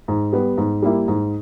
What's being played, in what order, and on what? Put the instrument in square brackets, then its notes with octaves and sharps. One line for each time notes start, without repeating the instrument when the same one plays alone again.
[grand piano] G#2
G3 B3
G#2
G3 A#3 E4
G#2